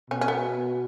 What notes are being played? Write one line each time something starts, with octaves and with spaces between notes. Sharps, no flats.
B2 C#4
C#4
B3